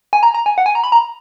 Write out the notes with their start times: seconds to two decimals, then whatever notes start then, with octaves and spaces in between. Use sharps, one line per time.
0.13 G#5
0.23 A#5
0.34 A#5
0.46 G#5
0.58 F#5
0.66 G#5
0.75 A#5
0.84 B5
0.92 A#5